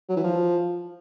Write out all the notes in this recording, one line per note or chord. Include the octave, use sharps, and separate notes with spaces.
F#3
E3
F3